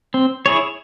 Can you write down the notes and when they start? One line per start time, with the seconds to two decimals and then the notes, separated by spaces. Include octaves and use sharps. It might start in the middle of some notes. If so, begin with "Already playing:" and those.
0.14 C4
0.46 E4 G#4 C#5